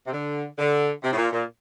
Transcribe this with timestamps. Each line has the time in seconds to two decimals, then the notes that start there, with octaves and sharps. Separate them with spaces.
0.06 C3
0.12 D3
0.58 D3
1.03 C3
1.12 A2
1.17 A#2
1.32 A#2